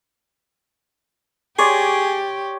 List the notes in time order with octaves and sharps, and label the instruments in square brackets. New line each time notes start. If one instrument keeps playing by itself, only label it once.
[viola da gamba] G4 [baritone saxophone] G#4 [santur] C#5 D5 C6